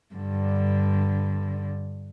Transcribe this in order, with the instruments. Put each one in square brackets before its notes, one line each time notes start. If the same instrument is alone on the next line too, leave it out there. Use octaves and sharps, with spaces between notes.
[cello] G2 D3